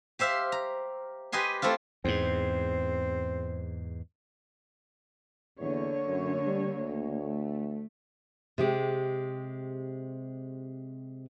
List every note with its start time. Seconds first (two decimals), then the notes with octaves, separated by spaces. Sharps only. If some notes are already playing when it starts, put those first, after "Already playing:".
0.19 G4 C5 E5 F5
0.52 A#5
1.32 G4 B4 D#5 G#5 C6
1.62 A3 C4 E4 F4
2.05 E2 G#2 C4
5.59 E2 D3 A#3 C#5
6.07 F#2
6.46 G3
6.79 D2
7.22 A3
8.58 C3 G#3 G4